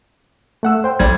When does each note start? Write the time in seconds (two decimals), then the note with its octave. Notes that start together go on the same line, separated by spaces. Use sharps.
0.63 A3 F#5 E6
0.84 C5 G5
0.99 B1 G3 G#6